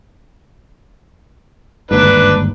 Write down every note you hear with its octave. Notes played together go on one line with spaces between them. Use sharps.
G1 D#2 G#2 D4 B4